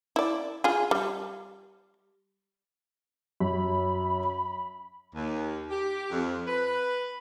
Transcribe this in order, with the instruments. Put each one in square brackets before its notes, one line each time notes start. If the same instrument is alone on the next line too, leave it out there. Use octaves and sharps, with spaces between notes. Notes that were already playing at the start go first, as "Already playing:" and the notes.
[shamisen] E4 D5
F4 G#4
G3
[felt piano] F#2 [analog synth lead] B5
[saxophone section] D#2
G4
F2
B4